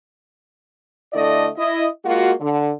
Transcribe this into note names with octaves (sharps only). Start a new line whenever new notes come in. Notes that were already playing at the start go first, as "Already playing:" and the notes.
D3 A3 E4 D5 D#5
E4 D#5
G#3 A#3 F4 F#4
D3